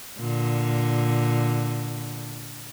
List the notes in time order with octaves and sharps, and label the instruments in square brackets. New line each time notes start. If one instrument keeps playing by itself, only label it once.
[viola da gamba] A#2 D3